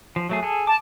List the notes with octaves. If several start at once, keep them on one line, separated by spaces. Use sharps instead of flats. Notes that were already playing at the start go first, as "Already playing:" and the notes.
F3
F#3 A3 G#4
G#4 A4
A5 D6